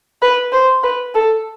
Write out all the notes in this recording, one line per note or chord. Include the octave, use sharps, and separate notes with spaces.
B4
C5
B4
A4